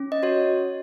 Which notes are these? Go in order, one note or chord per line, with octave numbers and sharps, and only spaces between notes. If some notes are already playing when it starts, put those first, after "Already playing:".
Already playing: C#4
D#5
F#4 C#5